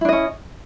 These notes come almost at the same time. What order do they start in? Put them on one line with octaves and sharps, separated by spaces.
E4 D4 D#5 C#4